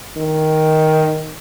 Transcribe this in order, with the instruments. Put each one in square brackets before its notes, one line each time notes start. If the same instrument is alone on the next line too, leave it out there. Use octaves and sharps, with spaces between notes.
[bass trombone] D#3